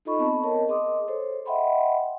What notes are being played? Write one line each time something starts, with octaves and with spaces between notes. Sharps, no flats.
D#4 F4 A4 D#5 B5 C#6
B3 C4 A5 B5
A#4 C#5 D#5 A5
G#4 D#5 C6 D6 D#6
A4 C5 C#5
D#5 E5 F#5 G5 B5 C6